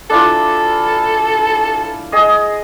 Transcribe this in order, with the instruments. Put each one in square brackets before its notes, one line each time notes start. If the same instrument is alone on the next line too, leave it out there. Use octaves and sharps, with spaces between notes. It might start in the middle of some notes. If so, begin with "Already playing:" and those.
[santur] D4 E4 F4 [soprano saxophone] A4
[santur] G#4 D#5